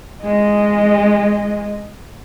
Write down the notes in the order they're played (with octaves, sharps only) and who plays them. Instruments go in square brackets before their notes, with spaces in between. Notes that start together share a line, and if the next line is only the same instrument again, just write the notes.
[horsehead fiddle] G#3 D#5